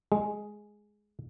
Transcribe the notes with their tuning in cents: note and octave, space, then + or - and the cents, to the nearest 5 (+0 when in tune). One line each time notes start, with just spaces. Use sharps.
G#3 +5